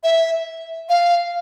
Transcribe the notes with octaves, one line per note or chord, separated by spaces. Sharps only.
E5
F5